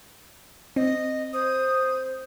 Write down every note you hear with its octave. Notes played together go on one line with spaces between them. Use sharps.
C4 D#5
C5 D#6